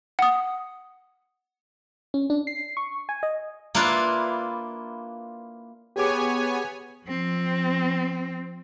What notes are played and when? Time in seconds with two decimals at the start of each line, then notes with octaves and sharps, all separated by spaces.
0.19 F#5 D#6
2.14 C#4
2.30 D4
2.47 C7
2.77 C#6
3.09 G#5
3.23 D#5
3.75 A#3 D4 E4 F4 B4
5.96 B3 G4 G#4 C#5 G#5 D6
7.07 F3 C4